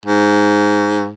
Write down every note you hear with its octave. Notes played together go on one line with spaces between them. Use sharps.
G#2